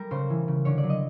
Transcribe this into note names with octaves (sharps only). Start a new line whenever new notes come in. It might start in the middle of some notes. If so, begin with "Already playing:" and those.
Already playing: G3 A#4
C#3 C5
E3
C#3
D3 C#5
D5
F#3
D#5